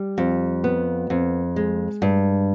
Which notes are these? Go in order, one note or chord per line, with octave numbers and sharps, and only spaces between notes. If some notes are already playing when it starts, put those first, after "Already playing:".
Already playing: G3
F2
B3
F2
G#3
G2